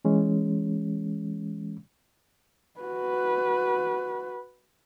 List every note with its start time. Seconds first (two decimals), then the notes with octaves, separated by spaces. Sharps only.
0.05 E3 G#3 C#4
2.80 F#4 B4